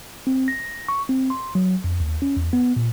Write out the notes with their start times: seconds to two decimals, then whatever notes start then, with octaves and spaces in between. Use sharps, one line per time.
0.27 C4
0.48 A#6
0.88 C#6
1.09 C4
1.30 C6
1.55 F#3
1.84 F2
2.00 D#2
2.22 C#4
2.37 E2
2.53 B3
2.76 A#2